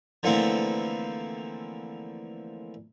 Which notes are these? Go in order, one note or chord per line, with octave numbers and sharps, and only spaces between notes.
D3 E3 F3 A3 A#3 C4